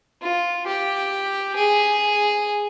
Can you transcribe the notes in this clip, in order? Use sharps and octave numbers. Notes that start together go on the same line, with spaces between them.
F4
G4
G#4